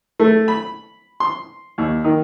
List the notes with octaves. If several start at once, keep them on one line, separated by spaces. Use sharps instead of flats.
A3
B5
C6
D#2
D#3